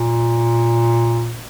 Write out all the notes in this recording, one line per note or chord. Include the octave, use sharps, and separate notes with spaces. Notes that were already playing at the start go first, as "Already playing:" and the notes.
Already playing: A#2